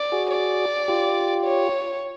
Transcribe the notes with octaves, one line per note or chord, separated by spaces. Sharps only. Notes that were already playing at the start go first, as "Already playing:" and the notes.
Already playing: D5
F#4 G#4
D5
F4 G4
C#5